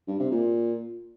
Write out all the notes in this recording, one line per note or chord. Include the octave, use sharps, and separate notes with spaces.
G2
C3
A#2